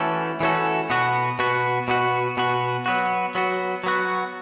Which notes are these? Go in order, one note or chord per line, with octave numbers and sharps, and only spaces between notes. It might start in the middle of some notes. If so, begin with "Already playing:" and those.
Already playing: E3 A3 C#4 F#4 A4
E3 A3 C#4 F#4 A4
B2 B3 F#4
B2 B3 F#4
B2 B3 F#4
B2 B3 F#4
F#3 B3 F#4
F#3 B3 F#4
F#3 B3 F#4